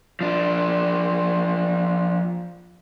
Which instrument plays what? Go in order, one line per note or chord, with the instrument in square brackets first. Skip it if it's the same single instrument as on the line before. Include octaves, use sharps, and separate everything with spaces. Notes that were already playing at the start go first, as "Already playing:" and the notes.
[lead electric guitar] F3 D4